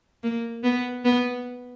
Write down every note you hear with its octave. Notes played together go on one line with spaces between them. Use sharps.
A#3
B3
B3